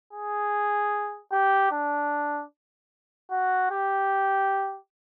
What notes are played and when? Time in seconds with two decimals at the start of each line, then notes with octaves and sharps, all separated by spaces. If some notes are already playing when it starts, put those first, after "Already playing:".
0.13 G#4
1.32 G4
1.72 D4
3.30 F#4
3.71 G4